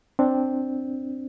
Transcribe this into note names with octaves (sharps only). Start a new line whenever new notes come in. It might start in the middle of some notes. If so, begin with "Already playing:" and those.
C4 D4